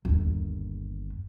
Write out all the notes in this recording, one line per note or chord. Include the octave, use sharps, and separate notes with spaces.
G1 D#2